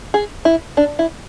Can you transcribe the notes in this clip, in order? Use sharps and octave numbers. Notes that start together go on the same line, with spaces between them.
G#4
E4
D4
E4